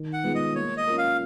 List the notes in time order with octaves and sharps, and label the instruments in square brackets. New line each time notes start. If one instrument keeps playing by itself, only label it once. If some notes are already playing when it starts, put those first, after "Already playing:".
Already playing: [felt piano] D#3
[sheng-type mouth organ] F#5
[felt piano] G#3 B3 F4 G#4
[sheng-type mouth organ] D#5
[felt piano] A#3 [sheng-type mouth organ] C#5
[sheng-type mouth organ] D#5
[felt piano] C#4 F4 A#4
[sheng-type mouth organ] F5